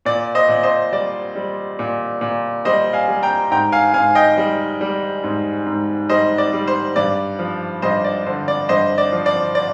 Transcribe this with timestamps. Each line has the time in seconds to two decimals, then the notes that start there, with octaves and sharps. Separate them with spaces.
0.05 A#2 D5
0.35 C5 D#5
0.48 A#2
0.63 C5 D#5
0.92 G3 D5
1.35 G3
1.79 A#2
2.21 A#2
2.65 G3 C5 D#5
2.93 F5 G#5
3.08 G3
3.23 G5 A#5
3.51 G#2 G5 A#5
3.72 F5 G#5
3.94 G#2 F5 G#5
4.15 D#5 G5
4.37 G3
4.81 G3
5.24 G#2
5.66 G#2
6.09 G3 C5 D#5
6.38 D5
6.53 G3
6.67 C5
6.96 G2 D5
7.39 F3
7.82 G2 C5 D#5
8.04 D5
8.26 D3 C5
8.48 D5
8.69 G2 C5 D#5
8.98 D5
9.12 F3
9.26 D5
9.55 D5